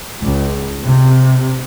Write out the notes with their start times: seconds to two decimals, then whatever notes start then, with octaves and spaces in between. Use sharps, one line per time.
0.21 C#2
0.85 C3